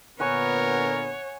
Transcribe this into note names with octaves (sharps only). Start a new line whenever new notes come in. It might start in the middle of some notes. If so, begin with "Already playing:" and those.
A#2 D3 B3 A#4 C#5 F#5 G#5 C#6